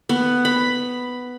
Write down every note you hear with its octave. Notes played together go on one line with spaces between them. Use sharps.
B3
B5